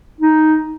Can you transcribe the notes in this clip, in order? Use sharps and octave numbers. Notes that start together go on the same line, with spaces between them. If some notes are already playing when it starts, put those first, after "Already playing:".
D#4